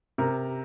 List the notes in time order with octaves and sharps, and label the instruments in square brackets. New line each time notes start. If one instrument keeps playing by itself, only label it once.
[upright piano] C3 A#4